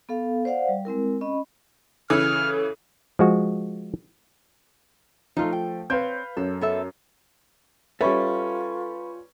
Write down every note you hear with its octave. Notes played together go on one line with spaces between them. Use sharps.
B3 A4 F5
C5 D5 F5 F#5
G3
G#3 C4 E4 A#4
C#4 D#5 B5
C#3 E3 A4 F6
F3 G#3 F#4
F3 A3 D#4 F4
G5
C4 B4 C#5 F5 G6
F#2 A4
B3 A4 E5
G3 C#4 F4 A4 B4 E5 B5 C#6